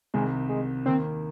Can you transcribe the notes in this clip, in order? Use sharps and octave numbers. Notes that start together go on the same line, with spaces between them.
C2 C3 D#3 G#3
G#3
D#2 D#3 A#3 C4